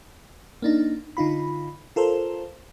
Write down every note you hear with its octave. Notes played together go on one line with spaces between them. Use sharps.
A#3 D4 D#4
D3 D#4 F4 B5
F4 A4 A#4 C5